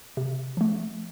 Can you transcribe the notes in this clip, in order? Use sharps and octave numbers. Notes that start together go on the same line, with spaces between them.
C3
F3 A3